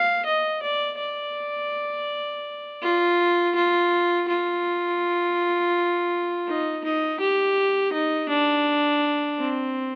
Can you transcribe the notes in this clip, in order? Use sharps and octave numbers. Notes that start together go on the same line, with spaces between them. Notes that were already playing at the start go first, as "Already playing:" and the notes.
Already playing: F5
D#5
D5
D5
F4
F4
F4
D#4
D#4
G4
D#4
D4
C4